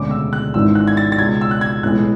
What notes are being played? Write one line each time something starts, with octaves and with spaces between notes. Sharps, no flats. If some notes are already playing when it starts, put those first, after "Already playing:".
Already playing: E1 D2 C#3 G#3 D6
E6
F#6
G#1 G#2 E3 G#3 C#4 E6
F#6
G#6
A6
A6
C#2 B2 G#3 G#6
E6
F#6
G#6
B1 A2 E3 G#3 F#6